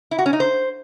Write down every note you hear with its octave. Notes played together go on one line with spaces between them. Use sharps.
E4
F#4
C#4
D#4
C5